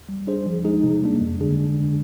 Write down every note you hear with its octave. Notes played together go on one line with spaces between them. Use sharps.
G3
D4 G#4 C5
F3
G#3 D#4 G#4
C3
G3 A#3 D4
F2
D3 G#3 D4 G#4